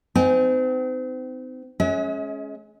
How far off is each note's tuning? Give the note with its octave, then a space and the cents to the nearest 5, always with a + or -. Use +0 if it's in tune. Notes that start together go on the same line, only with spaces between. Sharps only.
C4 -35 D#4 +0 G#5 +0
G#3 +25 C#4 +0 E5 -45